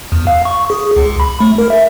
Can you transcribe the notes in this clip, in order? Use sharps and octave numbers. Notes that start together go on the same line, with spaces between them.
E2
F5
C#6
G#4
C#2
B5
A3
A#4
E5